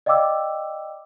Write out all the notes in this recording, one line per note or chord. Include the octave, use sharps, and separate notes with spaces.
D5 D#5 F5 G5 D6 E6